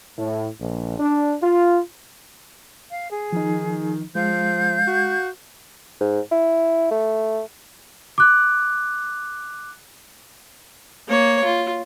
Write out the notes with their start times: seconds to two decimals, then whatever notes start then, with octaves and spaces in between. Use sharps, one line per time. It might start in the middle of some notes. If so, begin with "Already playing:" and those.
0.18 A2
0.60 A#1
0.99 D4
1.42 F4
2.91 F5
3.12 G#4
3.32 D#3 F3 D#4
4.15 F3 G#3 F5 G6
4.88 F#4
6.01 G#2
6.32 E4
6.91 A3
8.18 D6 F#6
11.07 A#3 C#5
11.44 F4